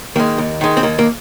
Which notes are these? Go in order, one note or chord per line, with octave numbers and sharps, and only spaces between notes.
D#3 G#3 A#3
D#2
D#3 G#3
C4
D#2 A#3
A#3